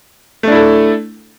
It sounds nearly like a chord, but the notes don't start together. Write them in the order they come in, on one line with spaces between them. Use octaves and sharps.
A3 D4 E4 A4